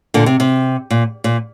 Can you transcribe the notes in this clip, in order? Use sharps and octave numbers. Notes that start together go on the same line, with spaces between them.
A#2 D3
C3
C3
A#2
A#2